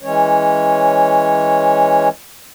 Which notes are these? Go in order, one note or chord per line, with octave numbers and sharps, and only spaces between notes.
E3 G#3 C#4 C#5